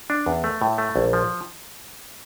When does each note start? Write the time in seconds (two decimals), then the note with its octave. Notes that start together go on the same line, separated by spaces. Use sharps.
0.10 D4
0.26 E2
0.44 A3
0.62 A2
0.78 A3
0.96 A#1
1.13 F3